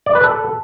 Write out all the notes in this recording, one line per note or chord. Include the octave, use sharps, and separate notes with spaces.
D5
B4
A4